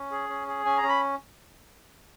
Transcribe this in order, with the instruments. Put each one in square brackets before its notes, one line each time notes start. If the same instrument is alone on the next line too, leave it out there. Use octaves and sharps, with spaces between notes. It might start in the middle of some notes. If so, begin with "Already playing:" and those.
Already playing: [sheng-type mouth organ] C#4
G#4
C#4
G#4
C#4 G#5
A#5
C#4
B5